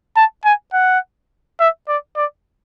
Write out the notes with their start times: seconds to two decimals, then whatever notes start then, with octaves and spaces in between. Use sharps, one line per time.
0.16 A5
0.45 G#5
0.73 F#5
1.60 E5
1.88 D5
2.17 D5